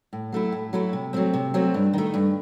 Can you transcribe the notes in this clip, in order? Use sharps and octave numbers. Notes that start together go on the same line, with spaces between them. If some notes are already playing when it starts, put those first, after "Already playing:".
A2
F#3 A3 E4
A2
F#3 A3 E4
C3
F#3 A3 C4
C3
F#3 A3 C4
G2
D#3 A3
G2